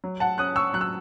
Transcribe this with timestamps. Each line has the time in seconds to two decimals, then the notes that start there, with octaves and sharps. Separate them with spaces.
0.04 F#3
0.20 F#5 A5
0.38 C#4 D#6 F#6
0.56 C#6 E6
0.74 F#3 F#6
0.81 E6